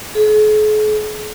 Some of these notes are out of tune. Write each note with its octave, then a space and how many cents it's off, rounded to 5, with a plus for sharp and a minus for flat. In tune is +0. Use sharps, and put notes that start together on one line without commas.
G#4 +45